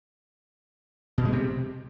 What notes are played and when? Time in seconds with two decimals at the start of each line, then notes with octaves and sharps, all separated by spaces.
1.18 B2
1.25 G#3
1.32 C3